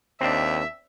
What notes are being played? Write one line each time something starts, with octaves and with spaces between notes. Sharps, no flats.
D#2 C4 D4 E5